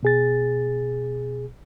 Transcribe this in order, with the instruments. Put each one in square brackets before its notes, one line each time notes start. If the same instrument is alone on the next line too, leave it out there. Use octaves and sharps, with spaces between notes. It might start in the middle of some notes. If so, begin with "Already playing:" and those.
[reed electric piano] B2 G#4 A6